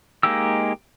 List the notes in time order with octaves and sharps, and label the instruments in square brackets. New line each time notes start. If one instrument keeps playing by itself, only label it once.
[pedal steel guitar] G#3 A#3 D#4 G4 E6